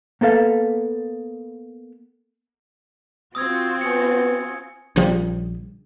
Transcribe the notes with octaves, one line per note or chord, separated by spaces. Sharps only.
A#3 B3 A4 F5
C4 F4 F#4 D#6 E6 G#6
B3 G#5 D#6 C#7
A#1 C#3 F3 G3